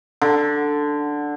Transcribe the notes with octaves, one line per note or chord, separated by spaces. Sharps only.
D3